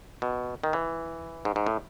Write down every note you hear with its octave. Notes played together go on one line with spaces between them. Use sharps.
B2
D#3
E3
G#2
G#2
A2